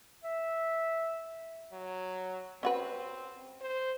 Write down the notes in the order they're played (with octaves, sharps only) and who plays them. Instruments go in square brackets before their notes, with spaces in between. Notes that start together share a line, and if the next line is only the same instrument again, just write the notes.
[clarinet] E5
[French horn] F#3
[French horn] C4 [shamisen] C#4 F#4 B4
[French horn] C5